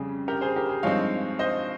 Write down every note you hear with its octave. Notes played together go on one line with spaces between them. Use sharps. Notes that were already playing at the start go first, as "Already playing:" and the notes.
Already playing: F2 C#3 G3 C#4 G#4
G4 A#4
G#4 C5
G4 A#4
G#4
G2 F3 G#3 C4 D#4 C#5 F5
C5 D#5